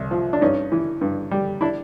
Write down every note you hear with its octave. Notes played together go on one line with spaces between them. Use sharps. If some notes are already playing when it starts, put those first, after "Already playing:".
Already playing: C2
F3
D4
G2 C#4 D#4
E3
G2
G3
D4 E4